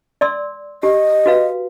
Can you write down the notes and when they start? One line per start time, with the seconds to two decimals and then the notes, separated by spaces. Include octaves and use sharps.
0.21 D5 C6 E6
0.83 G4 D#5
1.26 F#4 B4 F5